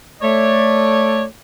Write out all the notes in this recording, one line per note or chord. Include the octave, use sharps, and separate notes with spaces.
A3 C#5 D5